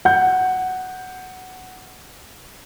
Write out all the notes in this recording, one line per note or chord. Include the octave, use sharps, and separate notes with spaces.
F#5 G6